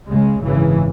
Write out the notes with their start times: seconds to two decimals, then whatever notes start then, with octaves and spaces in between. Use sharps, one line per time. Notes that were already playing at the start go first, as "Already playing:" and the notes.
0.08 C#2 C#3 G#3
0.41 G#1 F#2 C#3 E3